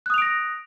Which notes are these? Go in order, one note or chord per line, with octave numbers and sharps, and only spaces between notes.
D#6 F#6 A#6 D7 F7